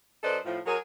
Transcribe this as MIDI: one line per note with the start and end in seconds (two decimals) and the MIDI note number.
0.23 0.38 42
0.23 0.38 69
0.23 0.38 71
0.23 0.38 72
0.23 0.38 74
0.23 0.38 75
0.45 0.59 45
0.45 0.59 53
0.66 0.77 54
0.66 0.77 68
0.66 0.77 70